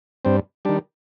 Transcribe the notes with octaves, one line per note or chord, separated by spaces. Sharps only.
G2 C4
D#3 G3 D4